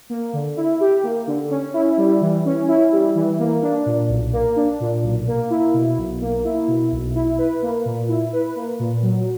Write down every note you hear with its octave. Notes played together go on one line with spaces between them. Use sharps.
A#3
D3
E4
G4
A#3
D3
C#4
E4
G3
E3
C#4
E4
G3
E3
A#3
D4
A#2
B1
A#3
D4
A#2
B1
A#3
E4
B2
B1
A#3
E4
B2
B1
E4
B4
A#3
A#2
E4
B4
A#3
A#2
F#3